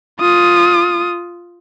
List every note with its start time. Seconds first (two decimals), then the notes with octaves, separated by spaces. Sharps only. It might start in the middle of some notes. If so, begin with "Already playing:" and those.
0.20 F4 D#6